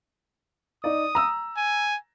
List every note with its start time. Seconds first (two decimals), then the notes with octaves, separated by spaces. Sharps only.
0.84 D#4 D5 D#6
1.15 A#5 E6
1.57 G#5